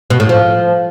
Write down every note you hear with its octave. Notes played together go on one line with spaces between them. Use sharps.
B2
A2
F3